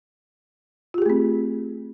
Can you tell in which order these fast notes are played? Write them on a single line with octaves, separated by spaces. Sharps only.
F4 G4 G#4 A3 C4